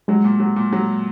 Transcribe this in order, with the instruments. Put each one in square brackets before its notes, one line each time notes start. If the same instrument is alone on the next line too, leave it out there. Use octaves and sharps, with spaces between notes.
[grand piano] F#3 [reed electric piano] G#3
[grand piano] A#2
F#3
A#2
F#3